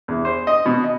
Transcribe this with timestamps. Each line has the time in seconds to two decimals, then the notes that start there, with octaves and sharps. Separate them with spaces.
0.08 E2
0.25 C5
0.47 D#5
0.66 B2
0.84 D#5